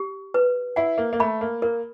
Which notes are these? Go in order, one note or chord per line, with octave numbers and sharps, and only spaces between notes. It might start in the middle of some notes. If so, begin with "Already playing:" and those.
Already playing: G4
B4
E4 F#5
A#3
A#3
A3 B5
A#3
A#3 A#4